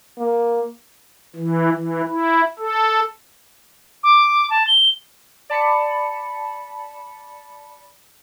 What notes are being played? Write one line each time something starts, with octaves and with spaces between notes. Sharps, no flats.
A#3
E3
E3
E4
A4
D6
A5
G7
D5 A5 B5 C#7